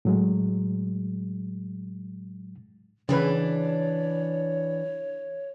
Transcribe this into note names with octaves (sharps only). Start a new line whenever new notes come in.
A2 F#3 G#3
C#3 E3 D4 B4 C#5